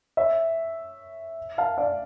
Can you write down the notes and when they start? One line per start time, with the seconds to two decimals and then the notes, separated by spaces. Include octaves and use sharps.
0.17 C#5 E5
1.58 F5 A5
1.77 D5 F5